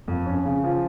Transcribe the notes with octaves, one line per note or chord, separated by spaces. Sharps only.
F2
C#4
C#3
F3